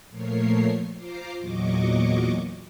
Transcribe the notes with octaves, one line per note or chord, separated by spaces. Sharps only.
A#2 F3 A3 A#4 C#5 C7
F4 C5 A#5 C6 D6
E2 A#2 F#3 D#5 C#6 D6